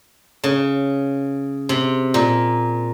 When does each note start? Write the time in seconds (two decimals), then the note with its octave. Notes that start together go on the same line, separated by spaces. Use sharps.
0.44 C#3
1.69 C3
2.14 A#2